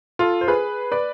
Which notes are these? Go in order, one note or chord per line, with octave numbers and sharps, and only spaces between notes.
F4 A4
C5
G#4 B4
B4 D5